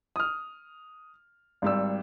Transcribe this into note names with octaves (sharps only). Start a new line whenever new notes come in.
D#6 F6
G#1 G3 E6